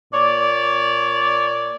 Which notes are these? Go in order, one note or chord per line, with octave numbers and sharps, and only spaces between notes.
A#2 C#5 D5